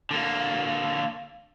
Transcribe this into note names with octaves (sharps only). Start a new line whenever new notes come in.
D3 A#3